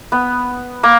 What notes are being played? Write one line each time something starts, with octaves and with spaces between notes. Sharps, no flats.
B3
A#3